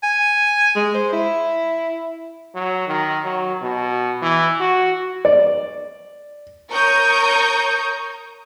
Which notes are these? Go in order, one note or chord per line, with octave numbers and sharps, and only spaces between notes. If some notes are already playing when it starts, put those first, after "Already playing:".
G#5
G#3
C5
E4
F#3
D#3
F#3
B2
E3
F#4
D5
A#4 C#5 A#5 C#6 D#6 G6